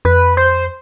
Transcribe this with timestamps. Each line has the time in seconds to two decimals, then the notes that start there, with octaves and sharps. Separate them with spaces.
0.05 F2 B4
0.37 C5